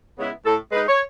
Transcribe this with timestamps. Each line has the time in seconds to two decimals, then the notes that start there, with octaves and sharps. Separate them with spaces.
0.18 C#3 G#3 B3 E4
0.45 A2 A4
0.72 G#3 D#4 B4
0.87 C#5